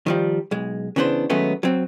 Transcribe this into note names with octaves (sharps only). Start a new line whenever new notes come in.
D#3 F3 G3
B1 G#3
C#3 E3 B3 D4 C5
D#3 F#3 G#3 A3 B3 C#4
F#3 C4